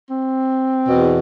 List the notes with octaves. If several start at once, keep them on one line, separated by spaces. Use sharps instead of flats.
C4
E2 B2